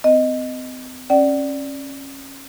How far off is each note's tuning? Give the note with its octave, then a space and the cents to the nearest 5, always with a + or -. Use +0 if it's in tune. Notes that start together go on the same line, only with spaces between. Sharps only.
C4 -40 D#5 +0
C#4 -25 D5 +0 F#5 +45